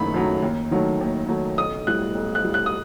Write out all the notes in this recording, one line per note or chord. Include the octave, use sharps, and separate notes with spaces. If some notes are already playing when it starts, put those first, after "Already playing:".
Already playing: F#1 F#2 D#3 F#3 A3 B5
F#2 D#3 F#3 A3
D#2
D#3 F#3 A3
D#2
D#3 F#3 A3
B1 D#6
A2 G3 F#6
B1
F#6
A2 G3
F#6
D#6